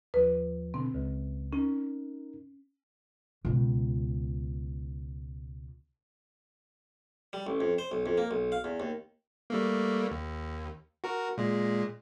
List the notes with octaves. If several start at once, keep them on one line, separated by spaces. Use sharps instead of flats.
D#2 F3 B4
B2 D3 C4
C#2
C#4 D#4 A#4
C#2 B2
G3
A1
F2
C5
B1
F2
A#3
B1
F5
E2
D#2
G3 A3 A#3
D#2
F#4 A#4
A#2 G#3